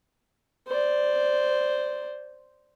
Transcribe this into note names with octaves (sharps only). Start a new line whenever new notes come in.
C5 D5